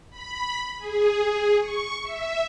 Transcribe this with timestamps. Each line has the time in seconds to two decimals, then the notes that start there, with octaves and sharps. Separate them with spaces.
0.10 B5
0.78 G#4
1.59 C#6
2.03 E5